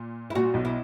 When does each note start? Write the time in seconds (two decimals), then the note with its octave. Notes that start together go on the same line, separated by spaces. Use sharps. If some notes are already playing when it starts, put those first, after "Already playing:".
Already playing: A#2
0.30 E4
0.35 A#2 F#4
0.54 B1 B2
0.65 E4